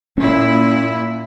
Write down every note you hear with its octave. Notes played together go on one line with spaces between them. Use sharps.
A#2 C#4 E4